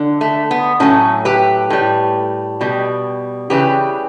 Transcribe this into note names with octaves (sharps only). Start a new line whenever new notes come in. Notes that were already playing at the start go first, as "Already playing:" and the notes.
Already playing: D3
A3
B3
A2 F#3 A3 C#4
G4 B4
A2 G3
B2 G3
C#3 E3 G3 G4 B4